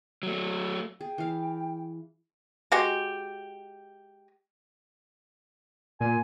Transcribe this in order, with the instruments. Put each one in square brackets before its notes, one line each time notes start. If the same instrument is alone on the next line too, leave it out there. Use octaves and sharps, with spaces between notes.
[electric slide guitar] F#3 A3
[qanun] G#4 [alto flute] G5
[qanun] E3 F5
[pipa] G#3 F#4 G4
[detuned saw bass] A#2 [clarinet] G#5